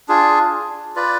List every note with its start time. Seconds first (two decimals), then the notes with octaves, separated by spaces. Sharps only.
0.08 D4 F4 G#4
0.96 F4 B4 D5